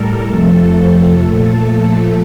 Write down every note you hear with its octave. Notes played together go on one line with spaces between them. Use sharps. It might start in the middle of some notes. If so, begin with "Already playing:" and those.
Already playing: A2 G3 A4 A#4
F2 C3 F3 A3 A4
A#2 F3 A3 A4